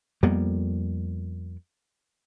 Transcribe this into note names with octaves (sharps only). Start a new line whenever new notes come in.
F2 G3 A#3 B3